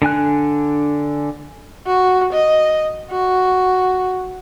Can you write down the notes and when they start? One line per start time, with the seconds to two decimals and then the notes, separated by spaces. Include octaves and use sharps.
0.02 D3 D4 G#5 F#6
1.87 F#4
2.33 D#5
3.11 F#4